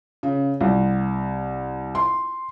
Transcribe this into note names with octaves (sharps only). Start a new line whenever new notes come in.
C#3
C2
C6